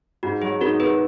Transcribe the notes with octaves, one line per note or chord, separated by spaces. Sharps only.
G#2 F#4
F#3 G#4
D#4 F#4 A#4
B3 G#4 B4